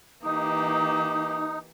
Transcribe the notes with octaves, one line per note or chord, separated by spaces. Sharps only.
E3 A#3 D#4 G4 D#6